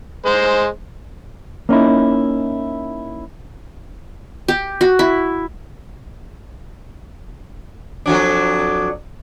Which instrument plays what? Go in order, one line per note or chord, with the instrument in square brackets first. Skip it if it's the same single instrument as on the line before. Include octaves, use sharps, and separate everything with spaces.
[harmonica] G#3 C5
[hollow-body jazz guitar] A#3 C#4 D#4 E4
[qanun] G4
F#4
E4
[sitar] F2 F#3 D4